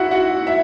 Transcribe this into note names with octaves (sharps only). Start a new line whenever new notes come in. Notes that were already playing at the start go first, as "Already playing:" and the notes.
Already playing: G#2 E4 F#4 E5 F#5
F#4 F#5
E5